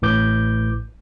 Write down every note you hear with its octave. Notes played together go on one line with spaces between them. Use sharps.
A1 A2 B4 D6 G6